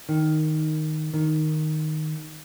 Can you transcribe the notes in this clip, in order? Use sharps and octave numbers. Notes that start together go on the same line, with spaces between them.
D#3
D#3